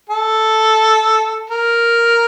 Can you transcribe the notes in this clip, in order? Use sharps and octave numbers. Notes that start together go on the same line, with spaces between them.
A4
A#4